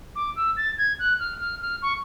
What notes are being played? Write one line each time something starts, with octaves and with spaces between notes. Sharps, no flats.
D6
E6
A6
G#6
F#6
F6
F6
F6
C#6